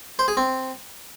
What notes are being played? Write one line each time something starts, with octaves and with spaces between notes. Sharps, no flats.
C5
G#4
C4